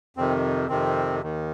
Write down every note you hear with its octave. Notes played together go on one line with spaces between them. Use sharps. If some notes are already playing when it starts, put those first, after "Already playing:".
F2 C3 D#3 C4
F2 C3 D#3 C4
D#2 D#3